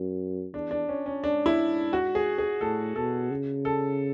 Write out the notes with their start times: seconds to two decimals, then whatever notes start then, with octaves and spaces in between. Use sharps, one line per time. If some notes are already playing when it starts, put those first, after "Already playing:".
Already playing: F#2
0.54 E2 D4
0.71 D4
0.89 C#4
1.06 C#4
1.23 G#2 D4
1.46 E4
1.93 F#4
2.15 G#4
2.38 G#4
2.61 A2 A4
2.96 B2 A4
3.30 C#3
3.65 A4